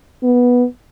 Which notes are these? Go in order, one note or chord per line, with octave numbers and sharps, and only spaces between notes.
B3